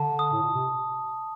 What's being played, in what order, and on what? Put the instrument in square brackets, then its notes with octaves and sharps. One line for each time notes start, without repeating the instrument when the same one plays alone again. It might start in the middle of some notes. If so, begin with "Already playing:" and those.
Already playing: [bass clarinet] D3 [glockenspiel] A5
[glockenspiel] D#6
[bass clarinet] A2
A#2
C3